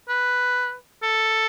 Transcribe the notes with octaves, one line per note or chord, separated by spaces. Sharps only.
B4
A4